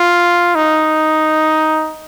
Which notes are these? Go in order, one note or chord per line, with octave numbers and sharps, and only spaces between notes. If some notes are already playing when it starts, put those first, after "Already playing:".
Already playing: F4
D#4